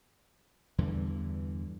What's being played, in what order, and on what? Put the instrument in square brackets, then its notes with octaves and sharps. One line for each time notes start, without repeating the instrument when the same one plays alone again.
[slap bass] E2 G2 D3 E3